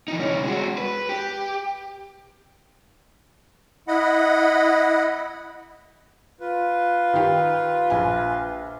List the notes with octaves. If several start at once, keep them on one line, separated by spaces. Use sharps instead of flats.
E3 D#4
C2 C#4
G#3 F#4
B4
G4
E4 D#5 F#5 B5
F4 B4
D#3 G4
A#1 G#5